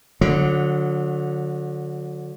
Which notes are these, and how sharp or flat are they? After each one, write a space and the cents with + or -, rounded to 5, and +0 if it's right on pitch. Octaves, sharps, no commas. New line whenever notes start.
D3 +0 F#3 -30